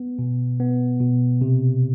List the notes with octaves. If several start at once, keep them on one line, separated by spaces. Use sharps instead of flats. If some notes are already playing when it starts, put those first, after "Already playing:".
Already playing: B3
B2
B3
B2
C3